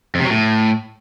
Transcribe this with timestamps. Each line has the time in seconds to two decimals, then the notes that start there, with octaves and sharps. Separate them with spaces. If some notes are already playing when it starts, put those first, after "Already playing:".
0.15 F2
0.20 C3
0.25 F#3
0.30 A2